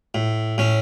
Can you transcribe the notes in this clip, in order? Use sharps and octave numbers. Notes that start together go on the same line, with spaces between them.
A2
A2 C#4